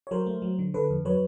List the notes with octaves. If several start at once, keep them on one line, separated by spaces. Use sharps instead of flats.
C#5
F#3 A#4 C5
A3
F#3
D3
D3 A4 B4
F2
F#3 B4 C#5